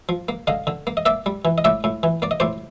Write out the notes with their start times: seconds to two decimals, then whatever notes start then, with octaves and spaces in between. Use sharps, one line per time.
0.09 F3
0.29 A#3
0.47 D3 D#5 F5
0.67 D3
0.87 A#3
0.97 D#5
1.06 A#3 D5 E5
1.26 G3
1.45 E3
1.58 D#5
1.64 A2 D5 E5
1.84 A2
2.03 E3
2.22 A#3 D5
2.31 D#5
2.40 A2 C5 D5